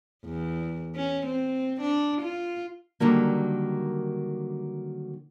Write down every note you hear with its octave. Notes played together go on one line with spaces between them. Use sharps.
E2
C#4
C4
D4
F4
D3 D#3 F#3 G3 A#3